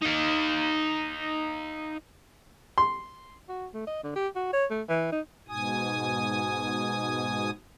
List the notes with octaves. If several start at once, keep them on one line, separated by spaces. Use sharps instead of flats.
D#4 F5
C6
F#4
A3
D#5
D3
G4
F#4
C#5
A3
E3
D#4
G#2 B2 G#5 D#6